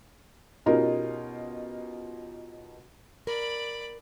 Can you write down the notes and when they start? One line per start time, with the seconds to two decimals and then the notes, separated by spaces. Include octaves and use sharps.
0.66 B2 C#4 D#4 F4 G4 A#4
3.27 A#4 D5 B5